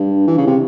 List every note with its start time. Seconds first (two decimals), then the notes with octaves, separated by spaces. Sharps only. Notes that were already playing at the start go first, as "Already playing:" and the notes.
Already playing: G2
0.27 E3
0.38 C#3
0.47 C3